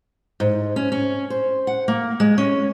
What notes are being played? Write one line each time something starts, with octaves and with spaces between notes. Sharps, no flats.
G#2
C#4
C#4
C5
F#5
A#3
G#3
C#4